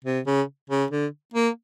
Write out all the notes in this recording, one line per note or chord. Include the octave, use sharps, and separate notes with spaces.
C3
C#3
C#3
D3
A#3